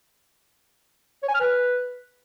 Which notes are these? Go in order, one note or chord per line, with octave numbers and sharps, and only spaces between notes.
C#5
G#5
F6
B4